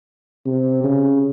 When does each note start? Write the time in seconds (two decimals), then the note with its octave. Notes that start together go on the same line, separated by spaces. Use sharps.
0.46 C3
0.84 C#3